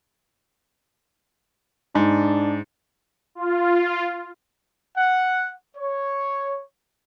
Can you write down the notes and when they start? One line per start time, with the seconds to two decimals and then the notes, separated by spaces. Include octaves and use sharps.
1.95 G#2 D4
3.35 F4
4.96 F#5
5.76 C#5